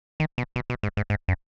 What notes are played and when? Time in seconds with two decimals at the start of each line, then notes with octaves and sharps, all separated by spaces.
0.20 D#3
0.38 B2
0.56 B2
0.70 B2
0.83 G#2
0.97 G#2
1.10 G#2
1.28 F#2